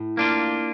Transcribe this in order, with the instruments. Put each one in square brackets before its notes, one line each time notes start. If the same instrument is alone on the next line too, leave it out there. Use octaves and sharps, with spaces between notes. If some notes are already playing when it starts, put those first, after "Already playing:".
Already playing: [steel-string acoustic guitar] A2
[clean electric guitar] A#3 D4 F4